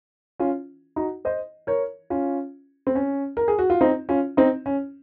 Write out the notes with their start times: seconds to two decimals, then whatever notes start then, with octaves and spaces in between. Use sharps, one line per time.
0.40 C#4 F4
0.96 D#4 F#4
1.25 C5 D#5
1.67 A#4 C#5
2.10 C#4 F4
2.87 C4
2.95 C#4
3.37 A#4
3.48 G#4
3.59 F#4
3.70 F4
3.81 C4 D#4
4.09 C#4 F4
4.37 C4 D#4
4.66 C#4